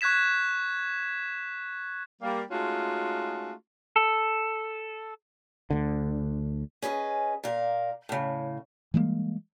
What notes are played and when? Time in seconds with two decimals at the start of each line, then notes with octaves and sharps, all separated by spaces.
0.01 C#6 F#6 G#6 B6 E7
2.22 G3 A#3
2.51 G#3 A3 C#4 D#4 F4 F#4
3.96 A4
5.70 D2 D3
6.82 C#4 G#4 B4 D#5
7.44 A#2 A#4 F5
8.09 A2 C#3
8.94 E3 G3 G#3 A#3